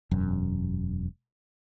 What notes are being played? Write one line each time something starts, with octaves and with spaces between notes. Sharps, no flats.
E1 F#2